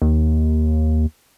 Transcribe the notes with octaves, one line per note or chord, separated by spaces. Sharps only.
D#2